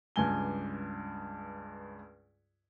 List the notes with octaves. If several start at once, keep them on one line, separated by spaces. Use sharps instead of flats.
C#2 G2 G#5 G7